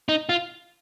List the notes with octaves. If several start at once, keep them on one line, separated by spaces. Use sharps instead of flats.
D#4
F4